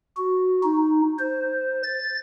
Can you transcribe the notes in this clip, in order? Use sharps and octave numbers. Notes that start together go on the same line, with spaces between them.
F#4
D#4
C5
A6